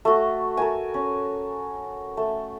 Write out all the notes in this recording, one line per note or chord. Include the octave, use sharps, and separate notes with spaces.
A3 F#4
A4 A#4 G#5
C#4
A3